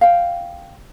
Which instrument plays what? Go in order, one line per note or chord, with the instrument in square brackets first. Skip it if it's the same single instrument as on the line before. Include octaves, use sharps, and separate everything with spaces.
[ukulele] F5 G5